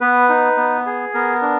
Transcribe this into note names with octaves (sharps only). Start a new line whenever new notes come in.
B3 B4
D#4
B3
G#4
B3 A#4
D4